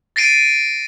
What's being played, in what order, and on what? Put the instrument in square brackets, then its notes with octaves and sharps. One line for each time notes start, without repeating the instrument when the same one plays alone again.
[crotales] A6 A#6 C7 D7 D#7